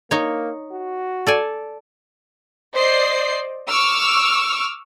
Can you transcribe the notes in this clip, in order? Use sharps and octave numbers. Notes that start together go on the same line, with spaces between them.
A#3 D#4 C#5
F#4
A4 D5 G#5
C5 D5 D#5 C7
C#6 D6 E6 F6